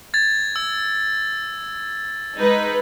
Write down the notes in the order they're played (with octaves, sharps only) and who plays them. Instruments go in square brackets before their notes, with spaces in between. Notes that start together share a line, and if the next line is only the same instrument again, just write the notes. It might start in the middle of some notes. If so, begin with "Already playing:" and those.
[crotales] G#6 A6
E6
[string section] G#3 D#4 B4